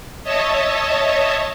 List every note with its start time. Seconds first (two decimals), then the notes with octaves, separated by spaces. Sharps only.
0.23 C#5 D#5 E5 A5